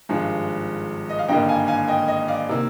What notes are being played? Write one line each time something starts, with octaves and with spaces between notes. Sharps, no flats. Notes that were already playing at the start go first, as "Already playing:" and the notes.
G#1 G2 F3 G#3
D#5
F5
G#1 G2 D3 G3 A#3 D#5 G5
F5 G#5
F5 G#5
D#5 G5
D#5
D5 F5
C3 D#3 A#3